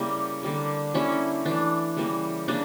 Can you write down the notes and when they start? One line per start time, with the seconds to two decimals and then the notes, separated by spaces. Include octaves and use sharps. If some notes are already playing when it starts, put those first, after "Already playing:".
Already playing: C#3 G3 A#3 E4
0.43 D3 G3 A#3
0.94 D3 G3 A#3 C#4 E4
1.45 E3 A3 D4
1.97 C#3 E3 G3 A#3
2.48 C#3 G3 A#3 D4